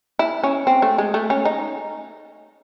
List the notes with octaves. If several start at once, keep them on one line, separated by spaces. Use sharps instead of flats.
E4
C#4
C4
A3
G#3
A3
C#4
D#4